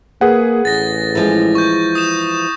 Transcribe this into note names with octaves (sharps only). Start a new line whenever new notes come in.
A#3 G#4 B4 F#5
A1 A6 A#6
E3 F3 G#3
C#6 G6
D#6 E7